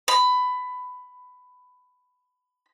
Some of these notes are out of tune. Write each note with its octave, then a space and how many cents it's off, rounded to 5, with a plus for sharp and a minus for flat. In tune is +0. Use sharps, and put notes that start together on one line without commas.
B5 +15